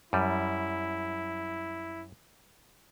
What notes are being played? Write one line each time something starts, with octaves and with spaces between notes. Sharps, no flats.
F#2 G3 E4